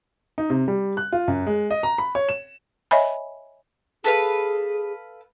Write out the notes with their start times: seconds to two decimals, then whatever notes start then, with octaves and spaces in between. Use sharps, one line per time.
0.38 D#4
0.50 C3
0.68 G3
0.97 F#6
1.12 F4
1.28 F#2
1.47 G#3
1.70 D#5
1.83 A#5
1.98 B5
2.15 C#5
2.29 E7
2.91 C#5 D#5 E5 G#5 B5
4.04 G#4 A4 B4 F5